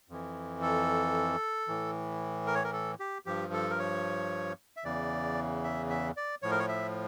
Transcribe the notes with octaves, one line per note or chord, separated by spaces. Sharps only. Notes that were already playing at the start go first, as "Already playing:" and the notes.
F2 E3
A4
A2 E3
A#4
C#5
A#4
A4
G4
G2 F3 G4
A4
A#4
C#5
E5
E2 C#3 E3 D5
E5
E5
D5
A2 F3 C#5
A#4
C#5
E5